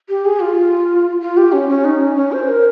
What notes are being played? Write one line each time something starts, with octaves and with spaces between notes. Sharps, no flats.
G4
G#4
F4
F4
G4
C#4
C#4
D#4
C#4
C#4
C5
A#4